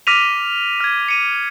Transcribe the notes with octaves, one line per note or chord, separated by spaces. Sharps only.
D6 F6 A#6 B6 D#7 F7
F6 G#6
C#7 D#7